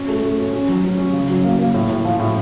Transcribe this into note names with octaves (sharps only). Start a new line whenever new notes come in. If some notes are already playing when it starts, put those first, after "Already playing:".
Already playing: C#4
A3
A3
C#4
C#4
F#3
C#4
C#4
C#3
F#3
A#3
A#3
A2
A2
F3
A2